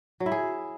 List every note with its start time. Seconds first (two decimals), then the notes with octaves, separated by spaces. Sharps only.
0.20 F#3
0.26 E4
0.32 G#4